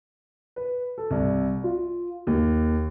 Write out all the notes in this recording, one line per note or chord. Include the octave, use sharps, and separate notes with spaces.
B4
A4
C2
F4
D#2